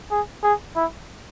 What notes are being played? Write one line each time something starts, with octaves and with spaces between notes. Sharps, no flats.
G#4
G#4
E4